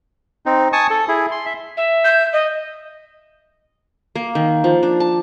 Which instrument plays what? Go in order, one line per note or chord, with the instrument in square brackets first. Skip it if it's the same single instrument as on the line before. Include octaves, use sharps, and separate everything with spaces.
[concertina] C4 D#4
G#5 A5 C#6 D#6
A4
E4 G#4
C6
E5
[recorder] E5
[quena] G6
D#5
[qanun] A#3
D#3
F3
D4
A5